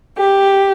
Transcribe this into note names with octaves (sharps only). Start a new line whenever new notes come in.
G4